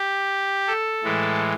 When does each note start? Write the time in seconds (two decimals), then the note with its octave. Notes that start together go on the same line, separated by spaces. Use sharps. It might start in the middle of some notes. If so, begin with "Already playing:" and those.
Already playing: G4
0.67 A4
1.03 A2 E3 G#3